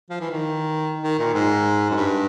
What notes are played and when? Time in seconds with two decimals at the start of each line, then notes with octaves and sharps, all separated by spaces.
0.10 F3
0.21 E3
0.31 D#3
1.03 D#3
1.19 A#2
1.34 G#2
1.90 F#2
1.96 G2